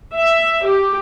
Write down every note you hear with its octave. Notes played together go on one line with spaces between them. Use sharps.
E5
G4